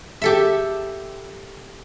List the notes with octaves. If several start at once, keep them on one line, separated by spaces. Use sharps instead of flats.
G4 A4 E5